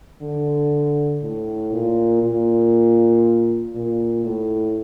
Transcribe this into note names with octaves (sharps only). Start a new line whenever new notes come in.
D3
A2
A#2
A#2
A#2
A2